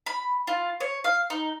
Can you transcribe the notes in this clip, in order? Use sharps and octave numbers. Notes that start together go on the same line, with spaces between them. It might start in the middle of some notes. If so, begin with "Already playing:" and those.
B5
F4
C#5
F5
D#4